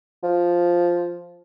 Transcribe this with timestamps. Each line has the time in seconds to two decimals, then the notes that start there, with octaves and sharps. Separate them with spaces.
0.24 F3